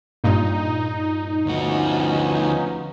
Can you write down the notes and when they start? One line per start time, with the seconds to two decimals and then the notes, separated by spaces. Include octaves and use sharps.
0.24 G2 A#2 D#4
1.46 D2 F3 B3 C#4 F#4